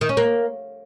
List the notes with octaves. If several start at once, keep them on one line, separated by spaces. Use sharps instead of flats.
D#3
C#4
A#3